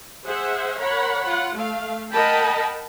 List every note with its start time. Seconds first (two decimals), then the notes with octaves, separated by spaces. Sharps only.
0.24 G#4 C5 E5 F#5
0.80 A#4 C#5 F#5 B5
1.26 F4 F#5
1.56 A3 F5
2.11 A#4 D#5 F#5 G5 A5 B5